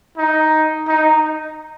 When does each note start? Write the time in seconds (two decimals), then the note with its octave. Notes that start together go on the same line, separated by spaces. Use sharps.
0.17 D#4
0.88 D#4